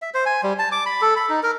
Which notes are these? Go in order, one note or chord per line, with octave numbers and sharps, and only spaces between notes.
E5
C5
G#5
G3
A5
D6
B5
A4
B5
D#4
A#4